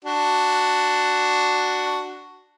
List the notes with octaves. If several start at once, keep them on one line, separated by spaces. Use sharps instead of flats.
D4 F#4